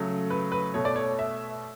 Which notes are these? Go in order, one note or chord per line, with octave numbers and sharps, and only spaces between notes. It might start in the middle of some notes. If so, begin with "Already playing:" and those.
Already playing: C#3 F#3 A3
B4
B4
B2 A3 C#5
D5
C#5
E5